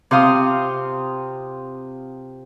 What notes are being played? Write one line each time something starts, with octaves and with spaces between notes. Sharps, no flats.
C3 F4 C5 F5 D#6